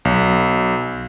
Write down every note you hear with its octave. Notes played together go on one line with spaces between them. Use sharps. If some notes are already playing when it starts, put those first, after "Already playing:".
B1